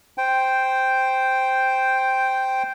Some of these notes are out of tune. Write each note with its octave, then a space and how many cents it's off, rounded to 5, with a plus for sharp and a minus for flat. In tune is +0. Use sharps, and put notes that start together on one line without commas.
C5 +0 G5 +0